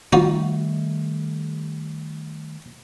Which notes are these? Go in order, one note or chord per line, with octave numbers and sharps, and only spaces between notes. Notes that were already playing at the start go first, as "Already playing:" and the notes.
D#3 F3 G3 A3 D#4 F#4